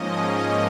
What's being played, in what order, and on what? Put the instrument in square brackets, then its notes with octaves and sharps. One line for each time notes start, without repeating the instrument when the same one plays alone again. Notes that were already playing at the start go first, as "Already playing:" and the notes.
Already playing: [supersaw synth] G#2 F3 A#3 C#4 D#5